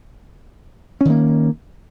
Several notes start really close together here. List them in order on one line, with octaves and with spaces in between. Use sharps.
C#4 D#3 A#3